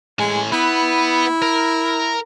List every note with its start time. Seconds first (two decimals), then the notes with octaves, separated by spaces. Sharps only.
0.19 A2 G#3 G#5
0.52 B3 E4
1.42 A#4